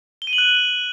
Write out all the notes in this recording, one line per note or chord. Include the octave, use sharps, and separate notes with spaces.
G7
D#7
F#7
F#6